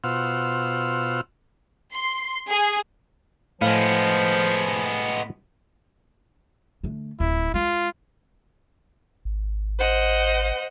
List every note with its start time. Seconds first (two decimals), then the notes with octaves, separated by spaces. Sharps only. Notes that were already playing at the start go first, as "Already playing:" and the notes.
0.04 B2 F4 C5 F#5 E6 F6
1.93 C6
2.49 G#4
3.61 A2 F3 G#3 B3 F5
6.83 D3 A3
7.20 D1 E4
7.54 G#3 F4
9.25 G#1
9.79 C5 D#5 F#5